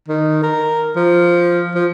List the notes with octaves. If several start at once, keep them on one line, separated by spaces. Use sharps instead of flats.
D#3
A#4
F3
F3